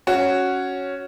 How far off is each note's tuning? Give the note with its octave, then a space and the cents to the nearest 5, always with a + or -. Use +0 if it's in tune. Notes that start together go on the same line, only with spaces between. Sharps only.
C#4 +0 F#4 +0